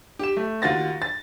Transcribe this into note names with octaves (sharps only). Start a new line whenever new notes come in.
G4 E7
A3
D#2 F4 F#4 A6 A#6
A6